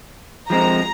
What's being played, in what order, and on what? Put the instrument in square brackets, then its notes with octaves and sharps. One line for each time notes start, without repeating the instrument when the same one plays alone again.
[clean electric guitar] F3 G#3 C4 [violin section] A#5